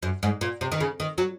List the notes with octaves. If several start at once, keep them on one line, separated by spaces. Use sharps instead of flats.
F#2
G#2
A#2
C3
D#3
C#3
D#3
F#3